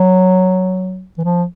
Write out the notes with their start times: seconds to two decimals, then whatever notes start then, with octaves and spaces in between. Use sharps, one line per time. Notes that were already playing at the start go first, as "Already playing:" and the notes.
Already playing: F#3
1.18 E3
1.24 F3